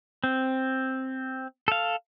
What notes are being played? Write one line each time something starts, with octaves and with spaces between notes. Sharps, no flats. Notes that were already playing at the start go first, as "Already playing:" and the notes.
C4
A4 F5